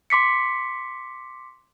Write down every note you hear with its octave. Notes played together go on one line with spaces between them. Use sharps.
C6 D6 B6 C#7